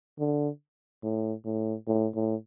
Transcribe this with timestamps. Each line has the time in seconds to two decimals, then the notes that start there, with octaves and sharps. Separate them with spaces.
0.19 D3
1.03 A2
1.45 A2
1.87 A2
2.15 A2